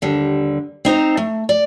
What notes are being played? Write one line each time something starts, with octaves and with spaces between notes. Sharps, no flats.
D#2 D3 G3
C4 D#4 C5 A#5
A3
D5